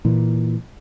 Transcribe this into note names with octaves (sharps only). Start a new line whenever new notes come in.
A#2 E3